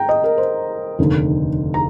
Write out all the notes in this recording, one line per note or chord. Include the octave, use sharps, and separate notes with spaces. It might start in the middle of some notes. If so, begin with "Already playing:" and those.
Already playing: G5 A#5
D#5
A#4
C5
F1 D#2 D3
A#5